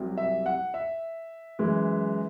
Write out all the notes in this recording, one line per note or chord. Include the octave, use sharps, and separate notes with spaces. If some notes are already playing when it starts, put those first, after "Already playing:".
Already playing: C2 C3 F#3
E5
F#5
E5
F#2 E3 G#3